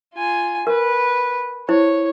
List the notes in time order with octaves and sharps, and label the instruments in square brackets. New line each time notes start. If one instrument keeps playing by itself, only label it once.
[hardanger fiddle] F4 G#5
[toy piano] A#4 [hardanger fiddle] B4
[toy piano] E4 C5 [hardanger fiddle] C#5